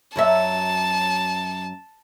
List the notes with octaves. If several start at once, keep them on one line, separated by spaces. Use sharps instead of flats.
F#2 F#3 E5 A5